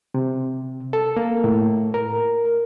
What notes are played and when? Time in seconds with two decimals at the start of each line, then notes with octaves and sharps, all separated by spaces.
0.14 C3
0.93 A4
1.17 A#3
1.44 A2
1.94 A#4